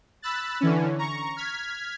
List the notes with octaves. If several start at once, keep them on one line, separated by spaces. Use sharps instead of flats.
B5 E6 F#6 A6
D3 E3 C#4
A#5 C#6
F6 G#6 B6